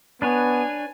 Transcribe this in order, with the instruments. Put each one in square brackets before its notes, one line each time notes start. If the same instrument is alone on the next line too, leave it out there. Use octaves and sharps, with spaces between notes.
[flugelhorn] B3 [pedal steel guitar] D4 B4 C#5 [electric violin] G#5